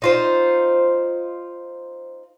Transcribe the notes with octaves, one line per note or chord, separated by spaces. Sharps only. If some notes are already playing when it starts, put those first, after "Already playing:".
D#4 F4 C5